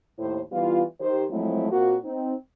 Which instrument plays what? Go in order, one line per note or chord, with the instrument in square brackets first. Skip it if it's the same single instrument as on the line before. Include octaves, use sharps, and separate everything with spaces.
[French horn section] D#2 A2 E4 C5
E3 G3 B3 E4 F4
D#3 G4 C5
F3 F#3 G#3 A3 C4 E4
A#2 A#3 C4 F#4
C4 D#4